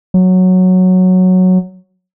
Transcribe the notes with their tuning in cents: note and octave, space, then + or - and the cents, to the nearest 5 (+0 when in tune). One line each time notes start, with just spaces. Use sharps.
F#3 -5